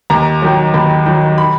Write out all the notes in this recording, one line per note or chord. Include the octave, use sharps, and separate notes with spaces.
D#2 A#5
D#3 F#3
D#2 B5
D#3 F#3
B5